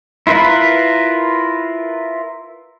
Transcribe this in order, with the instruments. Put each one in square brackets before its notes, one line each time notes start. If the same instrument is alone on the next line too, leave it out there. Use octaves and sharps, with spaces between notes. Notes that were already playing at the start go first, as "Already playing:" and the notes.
[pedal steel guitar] E4 F4 A#4 B4